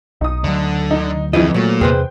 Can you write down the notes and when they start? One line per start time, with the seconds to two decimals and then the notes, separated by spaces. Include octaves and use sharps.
0.21 B1 D#4 D#6
0.44 D2 D3 F#3
0.91 D#4
1.33 F2 E3 F3 E4 G#4 D#5
1.54 A#2 F#3 A3
1.81 E2 C3 G#4 B4 C5 G5